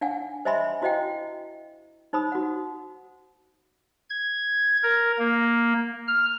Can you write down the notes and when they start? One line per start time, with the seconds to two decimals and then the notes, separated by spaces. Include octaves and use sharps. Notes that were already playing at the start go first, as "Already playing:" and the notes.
0.01 D4 F5 F#5 G#5
0.45 C5 D#5 E5 G#5 B5 C6
0.82 E4 F#4 C5 D#5 F5 G5
2.13 D#4 C5 B5 D#6
2.32 F#4 F#5
4.10 G#6
4.83 A#4
5.19 A#3
6.08 F6